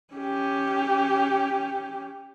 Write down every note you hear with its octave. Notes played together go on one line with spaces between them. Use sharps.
C#4 G4